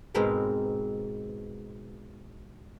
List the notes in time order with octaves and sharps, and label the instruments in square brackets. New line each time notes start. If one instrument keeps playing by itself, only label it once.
[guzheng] G#2 B2 G#3 C4 A#4 B4